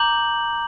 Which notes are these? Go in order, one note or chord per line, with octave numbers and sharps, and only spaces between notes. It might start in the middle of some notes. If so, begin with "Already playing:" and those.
Already playing: A#5 D6 G6 F#7